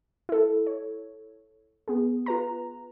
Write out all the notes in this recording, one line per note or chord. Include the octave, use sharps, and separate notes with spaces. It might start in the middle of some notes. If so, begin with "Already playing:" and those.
E4 A4
C#5
B3 G#4
F4 B4 A#5